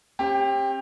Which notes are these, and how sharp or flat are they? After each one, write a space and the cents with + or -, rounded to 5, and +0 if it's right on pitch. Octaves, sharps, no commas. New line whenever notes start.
C4 +40 G4 +15